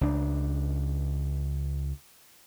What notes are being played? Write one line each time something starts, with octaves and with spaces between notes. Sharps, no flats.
C#2 D4